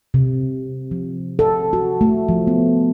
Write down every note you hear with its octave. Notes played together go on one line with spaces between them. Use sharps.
C3
F3
A4
F#4
A3
F3
B3